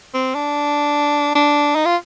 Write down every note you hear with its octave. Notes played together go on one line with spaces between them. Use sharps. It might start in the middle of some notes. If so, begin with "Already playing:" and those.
C4
D4
D4
D#4
F4